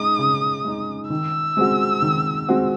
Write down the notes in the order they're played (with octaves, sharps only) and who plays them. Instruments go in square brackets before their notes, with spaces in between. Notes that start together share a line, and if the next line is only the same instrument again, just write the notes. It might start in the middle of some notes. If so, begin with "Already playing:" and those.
Already playing: [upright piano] G#3 D#4 [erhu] D#6
[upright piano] C#3
G#3 D#4
[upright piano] D#3 [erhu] E6
[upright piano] G#3 C4 F#4
D#3
G#3 C4 F#4